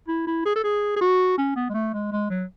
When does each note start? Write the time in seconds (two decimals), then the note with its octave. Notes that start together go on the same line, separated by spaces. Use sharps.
0.08 E4
0.27 E4
0.45 G#4
0.56 A4
0.64 G#4
0.96 G#4
1.01 F#4
1.38 C#4
1.56 B3
1.70 G#3
1.74 A3
1.94 G#3
2.12 G#3
2.30 F#3